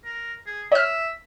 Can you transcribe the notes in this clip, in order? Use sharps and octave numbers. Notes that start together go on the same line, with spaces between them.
A#4
G#4
C#5 E5 F6